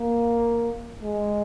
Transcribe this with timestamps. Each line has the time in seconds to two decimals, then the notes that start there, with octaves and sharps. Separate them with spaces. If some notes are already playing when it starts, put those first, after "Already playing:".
Already playing: A#3
1.03 G#3